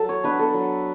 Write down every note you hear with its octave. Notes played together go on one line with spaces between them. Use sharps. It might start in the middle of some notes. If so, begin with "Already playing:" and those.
Already playing: F#3 A4
C#5
B3 D4 B4
A4
F#3